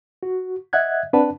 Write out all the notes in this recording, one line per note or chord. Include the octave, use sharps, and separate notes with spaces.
F#4
D#5 E5 F#5 F#6 G#6
C4 D4 B4 D5 F#5 A5